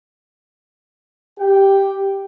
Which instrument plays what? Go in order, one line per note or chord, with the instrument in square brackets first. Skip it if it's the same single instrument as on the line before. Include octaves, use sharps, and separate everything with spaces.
[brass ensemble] G4 G5